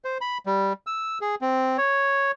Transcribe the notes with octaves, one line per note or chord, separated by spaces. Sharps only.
C5
B5
G3
E6
G#4
C4
C#5